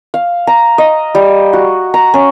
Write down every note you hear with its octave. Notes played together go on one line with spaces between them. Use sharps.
F5
A#5
D#5
G3
F#4
A#5
C#4